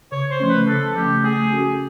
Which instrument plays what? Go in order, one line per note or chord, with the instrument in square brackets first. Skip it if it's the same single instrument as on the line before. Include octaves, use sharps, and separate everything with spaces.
[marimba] C#3 [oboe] C#5
[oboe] C5
[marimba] F3 A3 C#4
[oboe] B4
[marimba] C#3 [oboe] A4
[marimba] F3 A3 C#4 [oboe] G4
[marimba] A3 [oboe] G#4
[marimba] C#4 F#4 A4